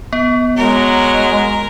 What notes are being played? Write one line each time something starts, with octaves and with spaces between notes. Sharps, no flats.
B3
F#3 G#3 A#4